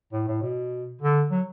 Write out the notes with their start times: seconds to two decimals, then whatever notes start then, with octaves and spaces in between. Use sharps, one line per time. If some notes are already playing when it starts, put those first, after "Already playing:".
0.13 A2
0.28 A2
0.43 B2
1.02 D3
1.31 F#3